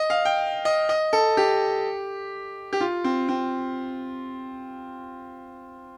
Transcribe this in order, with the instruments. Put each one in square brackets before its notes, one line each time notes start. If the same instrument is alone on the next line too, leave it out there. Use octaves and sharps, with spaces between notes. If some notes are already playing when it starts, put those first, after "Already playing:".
Already playing: [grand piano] D#5
F5
G5
D#5
D#5
A4
G4
G4
F4
C4
C4